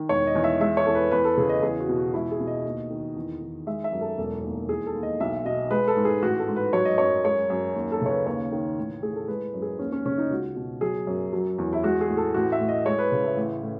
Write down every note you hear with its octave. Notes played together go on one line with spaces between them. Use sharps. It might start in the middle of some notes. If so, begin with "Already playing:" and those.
Already playing: D#3
E1 C#5
D#5
E2
E5
G#3 E5
C#5
E2 A4
B4
E2 B4
A4
C#3 G#4
D#5
E2 G#4
F#4
B2
F#4
C#2 E4
G#4
B2
D#5
D#2
D#3
E2
D#3
G#3 E5
E5
F#2
A4
E1 A4
D#2
E3 G#4
A4
D#2
D#5
B1 E5
B2 D#5
G#3 B4
A4
G#2
G#4
A1 F#4
A4
G#2
B4
F#3 C#5
D#5
F#2 C#5
G#3 C#5
F#2
D#2
A4
C#3 C#5
B4
D#2 C#5
D#3
A1
A2 G#4
A4
G#3 B4
F#2
G#4
D#2 C#4
C#4
C#3 C#4
D#4
C#2 F#4
B2
F#3 G#4
F#2
F#3
E2
E4
G#3 F#4
G#4
A2
A4
A1 F#4
E5
A2
D#5
G#3 C#5
B4
C#3
E4
A1
A2